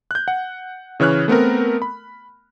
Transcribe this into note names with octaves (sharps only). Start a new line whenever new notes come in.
F#6 G6
F#5
C#3 E3 C#5 F6 F#6
A3 B3 C4 A#4
B5